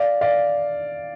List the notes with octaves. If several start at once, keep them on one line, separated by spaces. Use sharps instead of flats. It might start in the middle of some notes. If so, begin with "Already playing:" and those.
Already playing: D5 F5
D5 F5